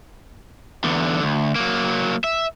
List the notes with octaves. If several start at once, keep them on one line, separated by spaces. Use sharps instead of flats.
E2 D3
D2
F#3 A#3
E5